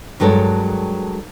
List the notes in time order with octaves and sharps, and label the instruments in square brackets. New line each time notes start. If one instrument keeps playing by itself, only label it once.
[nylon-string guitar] G2 F#3 G#3 A4 A#4 C#5